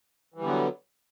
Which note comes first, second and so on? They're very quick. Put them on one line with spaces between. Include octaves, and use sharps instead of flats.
E3 G3 D3 B3 F#3